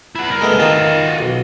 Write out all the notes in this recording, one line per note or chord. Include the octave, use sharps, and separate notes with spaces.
E4 F#5
C2 A#4
G#3 A3 B3
D#3 D#4 F4 F#4 A5
B1